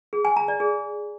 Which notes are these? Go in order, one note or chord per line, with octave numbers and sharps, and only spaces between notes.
G#4
G#5
A#5
D5
G#4